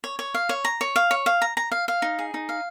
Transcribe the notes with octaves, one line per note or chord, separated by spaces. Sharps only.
C#5
C#5
F5
C#5
A#5
C#5
F5
C#5
F5
A#5
A#5
F5
F5
D#4
G#4
D#4
F5